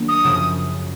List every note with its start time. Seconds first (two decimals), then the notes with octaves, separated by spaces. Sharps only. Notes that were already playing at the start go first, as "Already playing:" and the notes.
Already playing: D#3 F#3 A#3 D4
0.09 D#6
0.24 F#2 C#3 F3